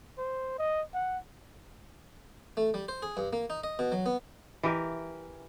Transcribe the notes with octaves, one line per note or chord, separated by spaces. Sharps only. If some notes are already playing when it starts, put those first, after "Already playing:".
C5
D#5
F#5
A3
G3
C5
G#4
G2
A#3
D#4
D#5
B2
F#3
B3
E3 G4 A#4